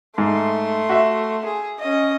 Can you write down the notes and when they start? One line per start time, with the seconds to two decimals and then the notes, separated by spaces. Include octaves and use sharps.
0.18 G#2 A3 C6
0.89 F#4 E5
1.45 G#4
1.79 C#4 D#5